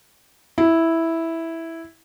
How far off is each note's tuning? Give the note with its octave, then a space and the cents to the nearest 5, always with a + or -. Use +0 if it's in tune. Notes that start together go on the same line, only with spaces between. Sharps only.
E4 -5